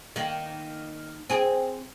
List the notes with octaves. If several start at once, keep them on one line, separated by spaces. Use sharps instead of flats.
D#3 A#3
C4 G#4